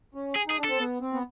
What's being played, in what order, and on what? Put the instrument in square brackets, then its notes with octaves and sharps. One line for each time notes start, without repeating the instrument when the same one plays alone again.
[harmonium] C#4
[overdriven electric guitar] G#4
[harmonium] D#4 [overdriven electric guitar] G#4
[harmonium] D4
[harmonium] C4 [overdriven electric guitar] A4
[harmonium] B3
C4
B3